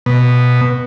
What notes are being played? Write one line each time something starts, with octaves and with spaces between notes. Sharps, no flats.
B2